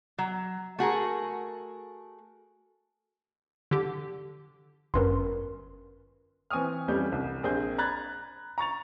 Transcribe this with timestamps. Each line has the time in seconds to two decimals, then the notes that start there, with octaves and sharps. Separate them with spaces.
0.18 F#3
0.79 A3 F#4 G#4 A#4
3.71 D3 G4
4.94 G1 F#2 A#4 B4 C6
6.50 E3 C4 G#5 C#6 D#6 F6
6.88 F2 E3 G3 A3 C#4 G6
7.12 C2
7.43 A#1 C4 G#4 A#4 G6
7.78 A#5 B5 F#6 G#6 A6
8.58 A#5 C#6 A6 F7